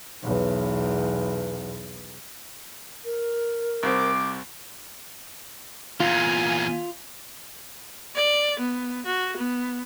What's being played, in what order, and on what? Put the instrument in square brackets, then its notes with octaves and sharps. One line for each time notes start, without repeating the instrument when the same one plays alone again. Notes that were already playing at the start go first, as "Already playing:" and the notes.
[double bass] B1 E2
[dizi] A#4
[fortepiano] C2 C3 C5 [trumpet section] D6
[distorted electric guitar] E2 A#2 [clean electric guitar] F4 [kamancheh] F5 G#5
[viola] D5
B3
F#4
B3